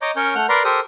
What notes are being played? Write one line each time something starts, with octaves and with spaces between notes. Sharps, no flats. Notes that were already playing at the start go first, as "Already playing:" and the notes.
C#5 D#5 A#5 D6 G6
C#4 A#4 C#5 G6
A3 F#5 F6 G6
A#4 B4 D5 A#5 C6
G4 A4 A#4 C5 D#6